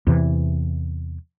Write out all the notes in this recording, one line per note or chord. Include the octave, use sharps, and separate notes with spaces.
E2 C3 E3